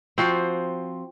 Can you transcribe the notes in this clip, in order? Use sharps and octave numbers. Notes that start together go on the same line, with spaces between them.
F3 C4 F#4